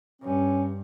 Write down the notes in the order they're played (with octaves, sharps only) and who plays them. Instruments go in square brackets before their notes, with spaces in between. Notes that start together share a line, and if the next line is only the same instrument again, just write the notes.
[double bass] G2 [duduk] C#4